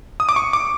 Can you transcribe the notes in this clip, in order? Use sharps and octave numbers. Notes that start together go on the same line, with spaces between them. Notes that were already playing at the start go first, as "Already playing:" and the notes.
D#6
D6
C#6
D6